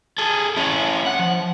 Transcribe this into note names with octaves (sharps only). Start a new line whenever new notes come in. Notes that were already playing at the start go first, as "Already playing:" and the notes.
G#4 A4
C#4 E4
F#5
F3